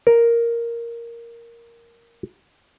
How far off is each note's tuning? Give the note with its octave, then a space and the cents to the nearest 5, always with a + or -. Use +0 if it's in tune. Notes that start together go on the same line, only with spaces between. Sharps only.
A#4 +0